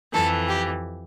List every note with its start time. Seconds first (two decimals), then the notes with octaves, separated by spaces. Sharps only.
0.13 F2 E3 A4
0.48 G4